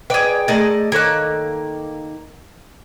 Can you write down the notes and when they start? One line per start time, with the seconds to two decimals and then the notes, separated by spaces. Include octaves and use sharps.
0.10 G#4 B4 D5 G5
0.48 A3 G#4 A#4 D5 D#5
0.92 D#3 A#3 A4 C#5 F#6